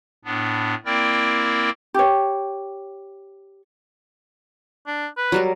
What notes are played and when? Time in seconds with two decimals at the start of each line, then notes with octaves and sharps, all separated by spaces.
0.25 A2 B3 D4
0.85 A#3 C4 E4 A#4 D5 G5
1.94 G4 C#5
4.87 D4
5.17 B4
5.32 F#3 G3 A#4